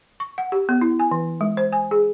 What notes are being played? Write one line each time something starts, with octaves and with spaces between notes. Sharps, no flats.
C#6
F#5
G4
B3
E4
G#5
E3
G#3
C5
G#5
G#4